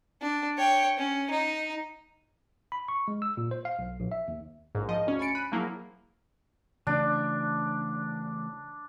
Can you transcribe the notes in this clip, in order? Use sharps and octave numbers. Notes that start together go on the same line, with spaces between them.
D4
C#5 G5
C#4
D#4
B5
C#6
G#3
E6
A#2
C5
F5
B1
A#1
E5
D#2
A#1 G#2
F3 D#5
D2 C#4
G#5 B5 A6 C#7 D7
B5 F#6 D#7
F3 F#3 A#3 E4 G#4
C#3 E3 A3 D4